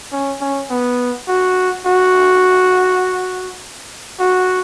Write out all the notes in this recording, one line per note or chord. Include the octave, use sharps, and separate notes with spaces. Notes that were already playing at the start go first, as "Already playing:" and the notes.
C#4
C#4
B3
F#4
F#4
F#4